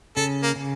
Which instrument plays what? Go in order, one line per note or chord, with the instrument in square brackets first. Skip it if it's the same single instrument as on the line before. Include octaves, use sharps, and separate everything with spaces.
[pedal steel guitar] C#3 [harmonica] A4
[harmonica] A#3
[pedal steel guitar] C#3